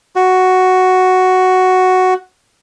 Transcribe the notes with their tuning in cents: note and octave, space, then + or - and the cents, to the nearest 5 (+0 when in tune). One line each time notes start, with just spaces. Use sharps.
F#4 +5